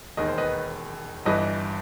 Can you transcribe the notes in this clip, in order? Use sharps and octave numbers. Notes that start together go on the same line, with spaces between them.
E1 D#2 D#3 D#5
C5
B4 D#5
G1 G2 E3 B4 D#5